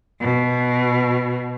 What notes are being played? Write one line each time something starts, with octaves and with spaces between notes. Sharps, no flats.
B2